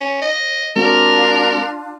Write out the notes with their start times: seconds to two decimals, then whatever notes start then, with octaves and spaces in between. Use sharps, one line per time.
0.01 C#4
0.22 D#5
0.76 G#3 C4 D4 F4 F#4 A#4